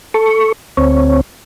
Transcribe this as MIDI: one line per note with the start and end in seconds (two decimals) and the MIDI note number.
0.14 0.52 69
0.14 0.52 85
0.77 1.21 38
0.77 1.21 60
0.77 1.21 73